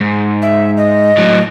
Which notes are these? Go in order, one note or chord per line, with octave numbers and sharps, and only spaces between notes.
G#2
E5
D#5
A2 F#3